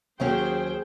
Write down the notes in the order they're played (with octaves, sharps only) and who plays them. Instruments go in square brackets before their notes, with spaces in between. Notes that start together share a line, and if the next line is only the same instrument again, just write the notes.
[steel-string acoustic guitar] D#2 F#3 C#4 [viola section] G#4 C5 G5